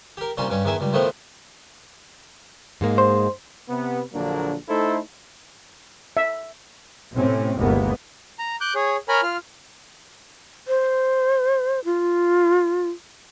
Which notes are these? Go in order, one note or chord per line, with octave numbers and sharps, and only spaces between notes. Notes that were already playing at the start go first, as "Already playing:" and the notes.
G4 A#4
C2 A#2 G3 C#4 C6
G2 G3 C#4
E2 D#3 E3 G#4 E5
C#2 G3
A2 D#3 F3 A3 B3 C4
G#2 G#3 A#3
C5
C3 B3
A#1 D3 F#3 A#3 D4
A3 D#4 E4 A4 C5
E5
A2 C3 C4 C#4
G1 D#2 C3 G#3 A#3 B3
A#5
D6 F#6 G6
G#4 C#5
A#4 C#5 G#5 A#5 B5 F6
F4 F6
C5
F4